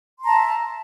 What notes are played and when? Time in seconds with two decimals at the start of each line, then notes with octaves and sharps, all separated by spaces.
0.19 C6
0.23 A#5
0.28 A5
0.32 E5